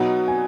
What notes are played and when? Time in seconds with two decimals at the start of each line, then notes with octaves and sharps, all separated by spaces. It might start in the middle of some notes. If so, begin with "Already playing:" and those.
Already playing: B2 F#3 B3 D#4 F#5
0.28 G#5